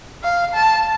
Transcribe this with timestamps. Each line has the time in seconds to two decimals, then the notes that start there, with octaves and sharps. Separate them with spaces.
0.23 F5
0.54 A5